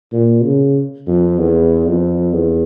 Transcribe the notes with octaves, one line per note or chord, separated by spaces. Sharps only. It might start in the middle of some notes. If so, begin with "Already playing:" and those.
A#2
C#3
F2
E2
F2
E2